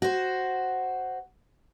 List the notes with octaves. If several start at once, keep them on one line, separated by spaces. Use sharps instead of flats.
F#4 C5